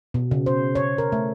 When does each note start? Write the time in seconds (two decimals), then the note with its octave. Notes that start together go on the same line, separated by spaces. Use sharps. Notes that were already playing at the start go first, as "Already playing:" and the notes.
0.14 B2
0.31 C#3
0.46 C5
0.75 C#5
0.98 A#4
1.12 A3